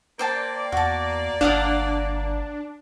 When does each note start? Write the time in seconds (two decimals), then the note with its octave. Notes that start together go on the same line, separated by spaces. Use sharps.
0.19 A#3 C5 D5 G5 A5
0.72 E2 F#4 A5
1.41 G1 D4 F5 F#5 D#6